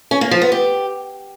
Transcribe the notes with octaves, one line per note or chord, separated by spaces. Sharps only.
C#4
A#3
F3
B3
G4